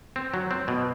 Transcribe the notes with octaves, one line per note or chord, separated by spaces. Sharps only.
C4
F#3
C4
B2